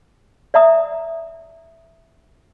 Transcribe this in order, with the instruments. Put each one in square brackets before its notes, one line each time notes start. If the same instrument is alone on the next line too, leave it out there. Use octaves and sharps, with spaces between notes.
[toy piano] D5 E5 A#5 D#6